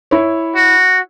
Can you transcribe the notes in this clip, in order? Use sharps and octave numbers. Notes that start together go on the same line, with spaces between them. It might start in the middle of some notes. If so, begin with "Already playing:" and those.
E4 C#5
F#4